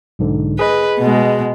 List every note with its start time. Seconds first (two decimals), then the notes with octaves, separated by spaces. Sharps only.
0.19 B1 G#2 D3
0.59 G#4 B4 D#5
0.99 B2 G#3